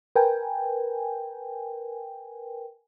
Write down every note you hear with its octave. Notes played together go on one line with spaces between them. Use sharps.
A#4 B4 G5 G#5